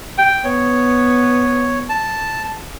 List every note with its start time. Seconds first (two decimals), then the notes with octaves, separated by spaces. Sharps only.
0.18 G5
0.44 B3 C#5
1.89 A5